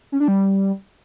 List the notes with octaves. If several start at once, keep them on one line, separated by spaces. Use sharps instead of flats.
C#4
D4
G3